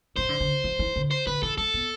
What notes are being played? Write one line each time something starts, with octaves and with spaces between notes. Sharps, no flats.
F3 C5
D3
D3
F3
E3
D3
C5
D3 B4
E3 A4
G#3 A4
B3